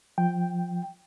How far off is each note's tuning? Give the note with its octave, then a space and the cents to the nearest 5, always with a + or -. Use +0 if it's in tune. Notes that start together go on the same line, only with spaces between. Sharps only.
F3 +10 G5 +0